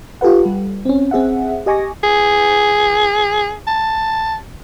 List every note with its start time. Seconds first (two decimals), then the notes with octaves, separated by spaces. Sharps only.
0.21 F4 G4 A4 B4 F#5
0.46 G3
0.85 C4 C#4
1.11 C4 G#4 E5 F#5
1.66 G4 D#5 G#5 C#6 D6 A#6
2.04 G#4
3.67 A5